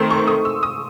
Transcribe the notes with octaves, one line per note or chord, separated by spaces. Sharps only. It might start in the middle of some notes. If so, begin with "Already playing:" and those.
Already playing: D#3 A3 C4 C6
C#6
D#6
E6
D#6